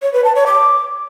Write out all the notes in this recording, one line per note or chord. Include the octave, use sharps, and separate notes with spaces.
C#5
B4
A5
C#5
D6